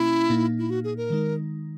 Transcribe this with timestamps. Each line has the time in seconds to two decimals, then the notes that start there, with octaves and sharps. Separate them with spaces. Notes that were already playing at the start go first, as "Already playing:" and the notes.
Already playing: B2 A#3 C#4 E4
0.30 A#2 A#3 D#4
0.59 E4
0.70 F#4
0.84 G#4
0.97 A#4
1.10 D#3 G#3 D#4